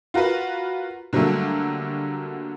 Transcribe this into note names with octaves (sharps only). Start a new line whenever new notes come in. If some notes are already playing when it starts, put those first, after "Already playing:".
F4 F#4 A#4 B4
D3 F#3 G3 A3 A#3